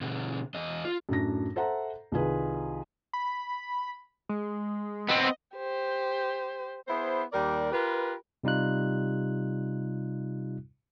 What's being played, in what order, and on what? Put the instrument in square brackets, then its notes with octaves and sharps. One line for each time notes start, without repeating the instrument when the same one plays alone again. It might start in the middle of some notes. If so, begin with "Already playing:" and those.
[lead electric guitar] B2 D3
E2 D#5
F4
[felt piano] F#2 A2 D4 A#6
A4 C5 E5 F#5 A#5
C2 D#3 F4 G#4 B4
[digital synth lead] B5
G#3
[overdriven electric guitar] B3 C4 [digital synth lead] D#5
[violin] G4 C5
[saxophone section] B3 E4 G#4 C5
D#2 G3 A#4 D5
F4 G4 A#4 B4
[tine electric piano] C3 G3 D#4 F4 F#6